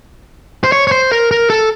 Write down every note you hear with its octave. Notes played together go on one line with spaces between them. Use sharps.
C5
C#5
C#5
C5
A#4
A#4
A4